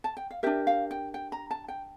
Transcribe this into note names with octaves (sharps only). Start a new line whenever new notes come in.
A5
G5
F5
D4 G4 A#4 E5
F5
G5
G5
A#5
A5
G5